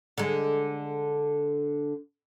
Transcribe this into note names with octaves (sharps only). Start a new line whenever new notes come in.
D3 G#3